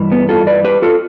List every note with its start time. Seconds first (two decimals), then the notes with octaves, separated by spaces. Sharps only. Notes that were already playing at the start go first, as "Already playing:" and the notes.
Already playing: G2 E3
0.12 B3
0.29 F4 A4
0.47 B4 D5
0.64 G4 B4
0.82 F4 A4